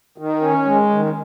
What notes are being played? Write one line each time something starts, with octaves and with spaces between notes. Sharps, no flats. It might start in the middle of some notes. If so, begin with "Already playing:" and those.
D#3
C#4
G#3
D#3